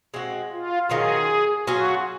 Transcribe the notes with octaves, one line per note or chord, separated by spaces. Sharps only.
G#3 C4 F#4
F4
D#3 F#3 C#4 F4 G#4
F#3 C#4 F4 F#4 G#4